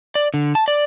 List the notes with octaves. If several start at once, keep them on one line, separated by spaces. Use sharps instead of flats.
D5
D3
A5
D5